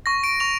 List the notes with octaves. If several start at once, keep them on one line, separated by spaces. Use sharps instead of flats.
C#6 A#6
D7
C#6 F7